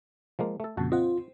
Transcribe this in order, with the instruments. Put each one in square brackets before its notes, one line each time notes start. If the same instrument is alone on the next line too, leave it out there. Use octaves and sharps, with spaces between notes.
[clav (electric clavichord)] F3 G#3 A#3
A3 A4
[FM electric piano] F2 A#2 C#3 [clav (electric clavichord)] F#4 F#5 A5
[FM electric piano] C4 C5 [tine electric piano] F4 [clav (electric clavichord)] D#5 F#5